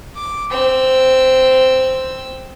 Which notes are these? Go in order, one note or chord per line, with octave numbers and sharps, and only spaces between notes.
D6
C4 E6